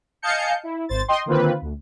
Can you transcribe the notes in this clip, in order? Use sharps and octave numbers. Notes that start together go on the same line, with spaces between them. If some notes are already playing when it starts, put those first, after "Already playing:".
D#5 F5 G#5 A5 G6 C#7
E4
G#1 C5 A6
D#5 G5 C6
D3 D#3 A#3 C4 F4 B4
D2